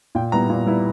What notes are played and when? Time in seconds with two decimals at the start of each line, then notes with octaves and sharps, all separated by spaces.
0.15 A#2 G5
0.32 G3 B3 E4 A#5
0.49 A#2
0.66 G3 B3 E4